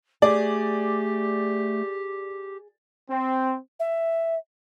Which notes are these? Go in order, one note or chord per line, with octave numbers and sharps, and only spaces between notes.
A3 G4 G#4 D5
C4
E5